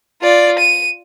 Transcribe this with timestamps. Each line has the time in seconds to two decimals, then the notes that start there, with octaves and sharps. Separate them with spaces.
0.22 F4 D5
0.59 D#7